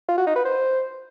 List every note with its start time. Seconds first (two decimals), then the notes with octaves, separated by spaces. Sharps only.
0.08 F4
0.18 F#4
0.27 D#4
0.36 B4
0.45 C5